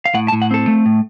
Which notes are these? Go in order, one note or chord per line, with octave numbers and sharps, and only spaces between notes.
F5
A2 F#5
A5
A2
F#5
C4 A4
A3
A2